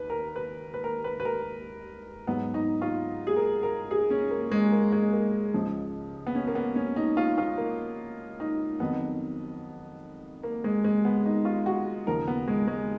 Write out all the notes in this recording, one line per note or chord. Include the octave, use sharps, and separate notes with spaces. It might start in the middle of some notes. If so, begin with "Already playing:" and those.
Already playing: D#2 B4
A#4
B4
B4
A#4
B4
B4
A#4
G#2 F#3 B3
D#4
F4
G#4
A#4
A#4
G#4
C#4
A#3
G#3
A#3
G#3
A#3
C#2 C#3 F3
B3
C#4
A#3
B3
C#4
D#4
F4
F4
A#3
D#4
F2 D#3 F#3 B3
A#3
G#3
G#3
B3
D#4
F4
F#4
D#2 C#3 F3 A#4
B3
G#3
G#3